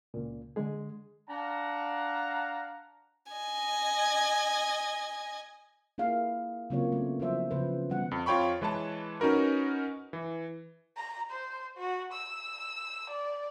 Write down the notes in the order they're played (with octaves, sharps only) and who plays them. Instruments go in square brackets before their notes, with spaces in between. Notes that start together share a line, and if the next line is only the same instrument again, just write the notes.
[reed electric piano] C#2 A#2
D3 G#3 G#4
[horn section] D4 F5 F#5 A5 A#5
[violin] D#5 G#5
[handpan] A#3 E4 G#4 F5
C#3 F#3 A#3 C4 F4 C#5
A3 B3
F3 F#3 E4 C5 E5
C#3 F3 B4 C5
E3 G3 B3 F#5
[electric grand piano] F2
F2 F4 C#5 G5 B5 C#6
E3 G#3 B4 C#5 A5
C#4 D#4 F#4 A#4 B4
E3
[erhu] A#5
C5
F#4
E6
D5